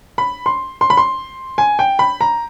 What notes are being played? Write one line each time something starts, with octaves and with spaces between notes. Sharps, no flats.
B5
C6
C6
B5
C6
G#5
G5
B5
A#5